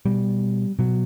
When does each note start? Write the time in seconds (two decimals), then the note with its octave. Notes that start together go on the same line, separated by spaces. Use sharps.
0.06 B2 G3
0.79 B2 F#3